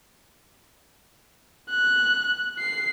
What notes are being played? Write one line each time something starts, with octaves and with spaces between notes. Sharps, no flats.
F#6
C7